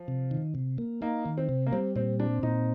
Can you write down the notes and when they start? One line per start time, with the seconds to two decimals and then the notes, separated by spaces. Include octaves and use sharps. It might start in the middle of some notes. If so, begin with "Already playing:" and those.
Already playing: F3
0.08 C3
0.31 D#3
0.55 C3
0.78 A#3
1.02 A#3 D#4
1.26 D#3
1.38 C4
1.49 C3
1.66 A#3
1.72 G3 C4
1.96 A#2 C4
2.20 C4 D4
2.43 A#2 D#4